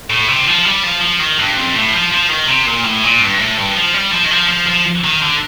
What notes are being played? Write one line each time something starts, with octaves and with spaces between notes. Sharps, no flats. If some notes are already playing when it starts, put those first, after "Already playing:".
A2
C3
D#3
F3
G3
F3
F3
D#3
G2
F2
A2
F3
F3
D#3
C3
A#2
A2
A#2
G2
A2
G2
F3
G3
F3
D#3
F3
F3
F3
D#3
D3